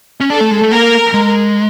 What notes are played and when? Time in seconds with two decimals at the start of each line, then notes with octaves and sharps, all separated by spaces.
0.20 C#4
0.30 D4 A4
0.41 A3
0.51 G#3
0.61 A3
0.71 A#3 A#4
1.14 G#3